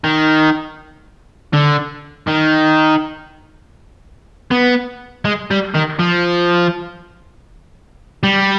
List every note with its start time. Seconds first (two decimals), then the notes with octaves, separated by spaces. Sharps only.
0.04 D#3
1.53 D3
2.28 D#3
4.51 B3
5.25 G#3
5.51 G3
5.75 D#3
6.00 F3
8.23 G3